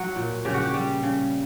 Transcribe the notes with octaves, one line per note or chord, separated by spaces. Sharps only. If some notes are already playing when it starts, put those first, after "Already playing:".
Already playing: F#3 F#4
A#2
C#3 G4
F#4
G4
G3
C#3